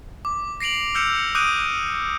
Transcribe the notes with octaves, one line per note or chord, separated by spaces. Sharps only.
D6
A#6 C7 D7 F7 F#7
E6 F6 G6 C#7 E7 F7
D6 D#6 F#6 G6 D7 D#7